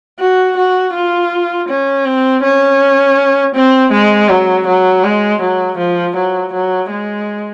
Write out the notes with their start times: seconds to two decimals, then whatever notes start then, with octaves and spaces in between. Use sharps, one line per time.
0.20 F#4
0.57 F#4
0.94 F4
1.69 C#4
2.06 C4
2.43 C#4
3.55 C4
3.92 G#3
4.29 F#3
4.67 F#3
5.04 G#3
5.42 F#3
5.78 F3
6.16 F#3
6.53 F#3
6.90 G#3